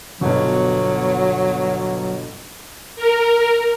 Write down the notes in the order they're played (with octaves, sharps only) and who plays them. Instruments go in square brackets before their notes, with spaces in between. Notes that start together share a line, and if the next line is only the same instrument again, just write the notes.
[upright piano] G1 B2 [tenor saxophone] F#3
[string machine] A#4